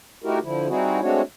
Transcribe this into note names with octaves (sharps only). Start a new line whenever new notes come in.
A3 D#4 E4 F#4 G4 A#4
D3 F3 E4
G3 C4 D#4 E4 F#4 G#4
G#3 A3 C4 D4 F#4 C#5